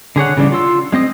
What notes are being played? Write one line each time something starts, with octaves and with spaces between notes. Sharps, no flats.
D3 G#4 C#5 F#5
C#3 E3 G3 C4 D4
F4 C6 E6
G#3 C4 D#5 D#6